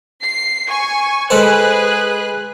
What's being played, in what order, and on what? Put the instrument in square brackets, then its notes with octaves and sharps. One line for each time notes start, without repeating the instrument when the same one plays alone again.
[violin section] C7
G#5 C#6
[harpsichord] G#3 A4 C5 [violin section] G#4 B4 F#6